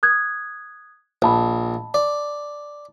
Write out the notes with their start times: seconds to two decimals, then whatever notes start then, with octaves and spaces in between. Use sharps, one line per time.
0.03 D#6 F#6 G#6
1.22 A#1 D#5 A5 B5
1.94 D5